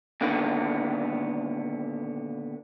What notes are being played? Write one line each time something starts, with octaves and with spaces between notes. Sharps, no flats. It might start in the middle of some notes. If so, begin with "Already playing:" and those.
A#2 D3 D#3 B3